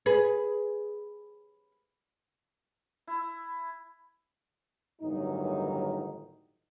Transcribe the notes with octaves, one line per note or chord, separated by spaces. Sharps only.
G#4 B4
E4
G1 A2 D#3 E3 F#3 D#4